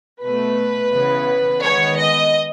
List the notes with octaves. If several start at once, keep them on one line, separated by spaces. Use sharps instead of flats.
B2 A3 B4
C#3 E3 B3
D#3 G#3 B3 C#5
D#5